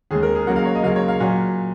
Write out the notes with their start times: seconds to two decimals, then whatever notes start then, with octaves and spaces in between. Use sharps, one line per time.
0.11 D#2 C#3 G#3 G#4
0.23 A#4
0.35 G#4
0.47 C#2 C#3 F#3 A#3 F#5
0.56 F5
0.65 C#5
0.75 D#5
0.83 C#2 C#3 F#3 A#3 F5
0.96 C#5
1.08 F5
1.20 A#2 F#3 F#5